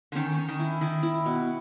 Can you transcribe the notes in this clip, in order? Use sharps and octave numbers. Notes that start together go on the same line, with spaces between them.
D3
D#3 C#4
C#4
D#3
E4
D#3 E4
E4
B2